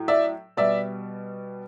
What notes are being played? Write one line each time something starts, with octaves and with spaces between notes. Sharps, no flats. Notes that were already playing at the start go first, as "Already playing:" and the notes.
Already playing: A2 F#3
D5 E5
B2 G3 D5 E5